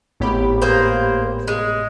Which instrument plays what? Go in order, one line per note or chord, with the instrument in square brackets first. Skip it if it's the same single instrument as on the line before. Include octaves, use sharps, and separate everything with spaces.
[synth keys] G#1 G4 B5 [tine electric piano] A2 B3 C#5
[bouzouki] A#3 G#4 C5
G#3